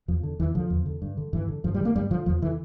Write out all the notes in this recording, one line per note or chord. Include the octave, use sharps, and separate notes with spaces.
E2 F3
D3
E2 E3
D3 F3
E2
D3
G2
D3
G2 E3
D3
G2 F3
G3
D3
A#3
G2 G3
D3 F3
E2 F3
D3 E3